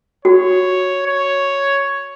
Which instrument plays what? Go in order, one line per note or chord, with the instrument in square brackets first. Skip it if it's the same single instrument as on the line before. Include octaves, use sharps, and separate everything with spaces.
[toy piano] F#4 [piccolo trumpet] C#5
[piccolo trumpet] C#5